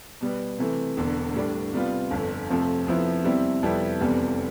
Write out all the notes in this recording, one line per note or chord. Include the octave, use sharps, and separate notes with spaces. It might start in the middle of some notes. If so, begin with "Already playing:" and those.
B2 G3 B3
C3 E3 A3
E1 E2 D3
A2 G3 D4
C3 G3 B3 F4
G1 F2 D3
F2 C3 F3 A3 C4
F2 C3 F3 B3 E4
E2 C3 G3 C4 E4
F2 C3 G3 B3 E4
F1 E2 C3 E3 G3